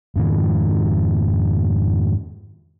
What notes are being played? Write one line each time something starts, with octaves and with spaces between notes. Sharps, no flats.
F2 G#2 D#3